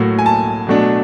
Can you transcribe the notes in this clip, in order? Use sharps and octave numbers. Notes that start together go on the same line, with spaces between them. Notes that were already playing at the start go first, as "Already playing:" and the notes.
Already playing: A2 F#3 A#3
G#5
A5
B2 F#3 A3 D4